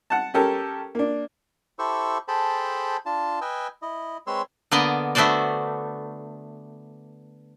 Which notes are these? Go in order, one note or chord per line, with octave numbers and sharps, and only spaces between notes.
F#5 A5
C#4 G4 A4 A#4
A#3 D4
E4 G4 A4 C5 C#6 E6
G#4 A4 C5 G5 A5 B5
D4 F4 A5
B4 D#5 G5 G#5 E6
E4 D#5
G#3 C4 B4 C#5 C6 E6
D3 A#3 B3 D5 D#5
A3 B3 D4 F#4 C5 D5